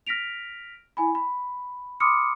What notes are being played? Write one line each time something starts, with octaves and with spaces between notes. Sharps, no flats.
F6 A#6 B6 D7 F7
E4 G#5 B5
B5
B5 C6 D6 D#6 F6 C#7